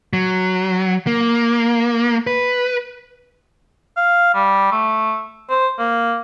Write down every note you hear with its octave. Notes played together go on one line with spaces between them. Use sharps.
F#3
A#3
B4
F5
G3
A3
C5
A#3